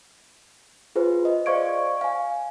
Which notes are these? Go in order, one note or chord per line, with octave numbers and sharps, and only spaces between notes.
F4 G#4 B4 C5
D#5
C5 D5 F5 C#6 G#6 D7
F5 G#5